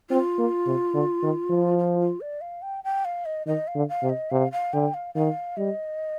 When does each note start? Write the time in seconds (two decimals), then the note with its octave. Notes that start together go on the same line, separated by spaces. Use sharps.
0.10 C4 F4
0.38 A#3
0.66 C3
0.94 D3
1.23 D#3
1.50 F3
1.79 F4
2.00 F4
2.21 D5
2.41 F5
2.62 G5
2.84 G5
3.05 F5
3.25 D#5
3.46 D#3 D#5
3.67 F5
3.75 D3
3.89 F5
4.02 C3
4.10 D#5
4.31 C3 F5
4.52 F5
4.73 D3 G5
4.94 F5
5.15 D#3 F5
5.57 G3 D#5